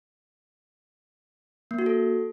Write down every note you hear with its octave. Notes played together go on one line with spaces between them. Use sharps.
A#3
F#4
A4